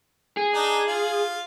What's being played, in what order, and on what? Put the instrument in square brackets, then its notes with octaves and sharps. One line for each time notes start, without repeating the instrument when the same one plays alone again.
[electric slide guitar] G#4
[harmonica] D4 D#4
F4